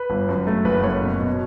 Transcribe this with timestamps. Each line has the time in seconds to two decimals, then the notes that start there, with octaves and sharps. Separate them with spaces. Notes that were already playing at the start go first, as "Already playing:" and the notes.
Already playing: B4
0.10 G1
0.29 F#2
0.47 A3
0.65 F#1 B4
0.83 F#2 C#5
1.01 B2
1.20 B2